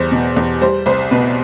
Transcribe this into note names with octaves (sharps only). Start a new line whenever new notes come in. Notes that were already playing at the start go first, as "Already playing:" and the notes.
Already playing: E2 G3 C5
B2
E2
G3 C5
C2 C5
B2 B4